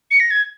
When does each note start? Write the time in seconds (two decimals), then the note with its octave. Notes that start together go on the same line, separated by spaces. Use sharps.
0.11 C#7
0.20 A#6
0.30 G#6